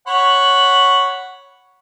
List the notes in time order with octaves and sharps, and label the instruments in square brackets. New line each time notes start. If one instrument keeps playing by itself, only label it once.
[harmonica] C#5 F#5 B5